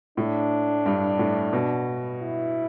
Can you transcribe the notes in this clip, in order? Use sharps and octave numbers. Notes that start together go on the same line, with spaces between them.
A2 D4
G2
A2
B2
E4